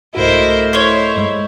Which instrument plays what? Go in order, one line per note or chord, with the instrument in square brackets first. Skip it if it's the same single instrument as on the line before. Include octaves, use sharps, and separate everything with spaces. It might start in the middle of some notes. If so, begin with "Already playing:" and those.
[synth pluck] C2 G#2 F#4 [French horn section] A3 D#5 [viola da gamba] E4 A#4 C5
[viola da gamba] E4 [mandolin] C5 C#5
[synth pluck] G2 G#3